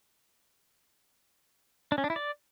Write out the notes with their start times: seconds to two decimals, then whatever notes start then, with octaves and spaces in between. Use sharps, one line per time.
1.92 D4
1.98 C#4
2.04 D4
2.10 E4
2.16 D5